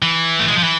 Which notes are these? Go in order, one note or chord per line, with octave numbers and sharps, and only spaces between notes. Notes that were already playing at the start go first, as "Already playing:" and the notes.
E3
A3
G#3
F3
E3